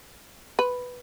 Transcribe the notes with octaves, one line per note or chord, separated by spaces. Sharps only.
B4